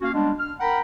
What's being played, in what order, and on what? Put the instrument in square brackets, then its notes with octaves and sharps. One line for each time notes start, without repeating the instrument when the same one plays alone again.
[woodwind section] A#3 C#4 F#4 F5
G3 G#3 B3 D4
F6
A#4 F#5 G5 A#5 B5